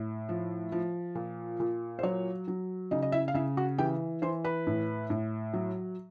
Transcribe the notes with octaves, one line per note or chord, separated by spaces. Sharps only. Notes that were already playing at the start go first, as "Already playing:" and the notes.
Already playing: A2
F3
F3
A#2
A#2
C5
F#3 C#5
F#3
C#3 D#4 D#5
D#5
E4 E5
F5
C#3 E4 E5
F#4 F#5
E3 G4 G5
E3 C5 C6
B4 B5
A2
A2
F#3